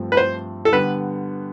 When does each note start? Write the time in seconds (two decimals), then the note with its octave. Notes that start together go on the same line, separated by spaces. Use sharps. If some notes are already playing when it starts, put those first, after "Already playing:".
Already playing: G2 F3 A3 C4
0.12 B4
0.17 C5
0.65 A4
0.72 D3 G3 B3 B4